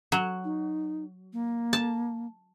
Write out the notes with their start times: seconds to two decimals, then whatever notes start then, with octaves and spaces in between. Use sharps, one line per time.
0.12 F#3
0.44 D#4
1.33 A#3
1.73 A5